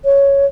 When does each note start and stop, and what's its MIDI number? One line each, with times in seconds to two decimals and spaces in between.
0.05 0.46 73